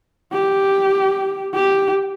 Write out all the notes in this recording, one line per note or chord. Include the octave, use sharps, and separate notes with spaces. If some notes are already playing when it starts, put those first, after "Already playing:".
G4
G4